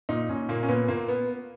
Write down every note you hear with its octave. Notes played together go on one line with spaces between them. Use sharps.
A#2 D#4
A#2 C#4
A#2 A#3
C#4
A#2 B3
A#2 A#3
B3